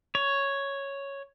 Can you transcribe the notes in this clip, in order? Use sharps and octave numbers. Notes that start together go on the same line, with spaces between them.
C#5